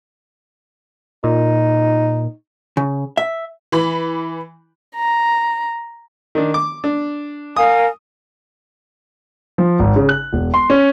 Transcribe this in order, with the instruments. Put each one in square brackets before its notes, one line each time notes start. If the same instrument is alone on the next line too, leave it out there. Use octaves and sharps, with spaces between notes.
[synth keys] A#2 [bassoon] D#4
[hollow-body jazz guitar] C#3
E5
[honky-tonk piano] E3 B5
[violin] A#5
[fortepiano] D#3 D4
D6
D4
[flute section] A#4 F5 G#5 [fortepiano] D#6
[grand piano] F3
G#1
C#3
F#6
E1
C6
C#4